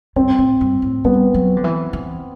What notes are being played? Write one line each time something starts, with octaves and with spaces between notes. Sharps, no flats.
G2 C4
A2
G2
A2
G3 B3
F#3
D3
E3
E3